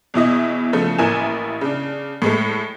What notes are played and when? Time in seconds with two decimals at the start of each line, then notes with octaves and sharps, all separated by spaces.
0.14 E2 B2 E4 D#5
0.73 C#3 F3 A3
0.98 A1 A#3 E4 G#5 E7
1.61 C#3 D4
2.22 A2 G#3 A3